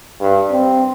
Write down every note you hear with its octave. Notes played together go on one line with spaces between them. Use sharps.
G2
C4